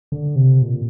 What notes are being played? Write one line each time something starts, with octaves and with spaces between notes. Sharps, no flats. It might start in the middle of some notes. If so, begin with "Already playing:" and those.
D3
C3
A#2